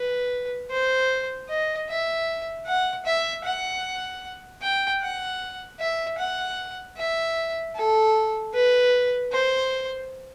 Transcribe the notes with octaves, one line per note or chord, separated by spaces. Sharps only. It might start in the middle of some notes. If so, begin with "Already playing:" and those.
Already playing: B4
C5
D#5
E5
F#5
E5
F#5
G5
F#5
E5
F#5
E5
A4
B4
C5